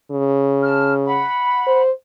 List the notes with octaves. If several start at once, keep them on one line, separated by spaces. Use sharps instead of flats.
C#3
A5 F6
F#5 B5
C5